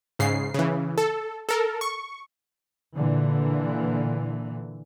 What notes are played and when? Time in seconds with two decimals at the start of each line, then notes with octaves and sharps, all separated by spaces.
0.19 G#2 C#3 C7
0.54 C#3 E3
0.98 A4
1.49 A4 A#4
1.81 C#6
2.95 A#2 D3 E3